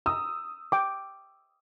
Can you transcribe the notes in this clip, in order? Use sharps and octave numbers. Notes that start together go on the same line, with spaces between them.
A#5 D#6 E6
G5 D6